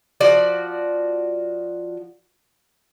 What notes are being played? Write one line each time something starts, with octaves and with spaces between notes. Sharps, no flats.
F3 F#4 D5